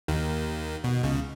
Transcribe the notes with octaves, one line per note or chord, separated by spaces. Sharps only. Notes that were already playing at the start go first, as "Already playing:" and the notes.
D#2 D#3
B2
C#2 C#3